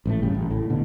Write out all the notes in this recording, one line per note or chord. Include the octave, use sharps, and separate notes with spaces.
A1 A2 A3
F#1 G2 C#3 G3
A1
A2
E1 B2 D3